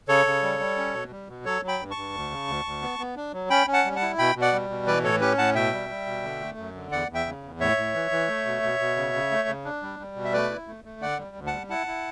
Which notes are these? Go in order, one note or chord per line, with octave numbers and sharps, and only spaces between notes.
C#3 A4 C#5
C#3
G3
G3
C#4
B2
G3
B2
F#3 A4 C#5
F#3
G5 B5
G2
A5 C#6
G2
D2
C#3
D2
D2
B3
B3
D4
F#3
C#4 G5 B5
C#4
F#5 A5
G3
F#5 A5
E4
B2 G5 B5
B2
D5 F#5
G3
B2
E3 B4 D5
A2 A4 C#5
C#4 G4 B4
A2 F#5 A5
B2 E5 G5
G3
G3
B2
D3
A3
F#2
D3
E2 D5 F#5
E2
E5 G5
C#3
E2
A2 C#5 E5
A2
E3
E3
A3
B2
B2
B2
C#3
C#3
A3
C#3
D4
G3
G3
B2
E5
A3 B4 D5
E4
A3
A3
D3 D5 F#5
G3
D2
F#5 A5
G3
E4 F#5 A5
E4